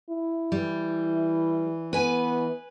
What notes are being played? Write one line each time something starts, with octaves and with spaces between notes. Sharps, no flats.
E4
E3 G3
B3 B4 G#5